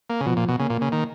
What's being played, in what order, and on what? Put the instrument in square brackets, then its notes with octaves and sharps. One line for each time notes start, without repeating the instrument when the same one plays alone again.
[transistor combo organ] A#3
C#3
[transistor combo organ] B2 [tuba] F3
[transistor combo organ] A#2
B2
[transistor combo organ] C#3 [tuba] A#3
[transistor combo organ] A#2
C#3
D#3